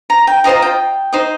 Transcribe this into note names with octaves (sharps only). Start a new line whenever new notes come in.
A#5
G5
F4 C5 D#5 A#5
G5
D#4 C5 D#5